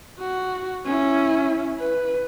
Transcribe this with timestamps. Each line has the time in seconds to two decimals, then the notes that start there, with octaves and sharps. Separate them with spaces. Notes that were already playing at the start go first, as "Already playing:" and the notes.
0.19 F#4
0.85 C#4 E4
1.79 B4